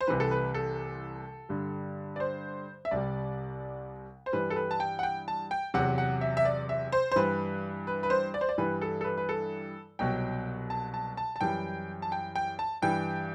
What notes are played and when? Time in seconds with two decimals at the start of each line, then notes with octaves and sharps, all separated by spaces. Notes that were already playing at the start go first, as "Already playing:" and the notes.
0.01 C5
0.07 C2 C3 E3 B4
0.20 A4
0.31 B4
0.54 A4
1.49 G2 D3 G3
2.16 D5
2.20 C5
2.85 E5
2.91 C2 C3 G3 D5
4.26 C5
4.33 G2 E3 G3 B4
4.50 A4
4.56 B4
4.71 A5
4.80 G5
4.99 F#5
5.03 G5
5.28 A5
5.51 G5
5.74 E2 C3 F#3 F#5
5.98 F#5
6.21 E5
6.37 E5
6.45 D5
6.69 E5
6.92 C5
7.12 C5
7.16 G2 E3 G3 B4
7.87 B4
8.03 B4
8.10 C5
8.34 D5
8.41 C5
8.49 D5
8.58 G2 E3 G3 B4
8.81 A4
9.01 A4
9.04 B4
9.17 B4
9.29 A4
9.99 C2 B2 F#3 G5
10.70 A5
10.94 A5
11.17 A5
11.36 A5
11.41 F#2 E3 G3 G5
12.02 A5
12.12 G5
12.36 G5
12.59 A5
12.82 G2 E3 G3 G5